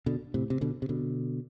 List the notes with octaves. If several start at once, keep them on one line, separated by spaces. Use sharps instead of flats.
B2 D3
A2 C3
C3
B2 D3
C3
B2 D3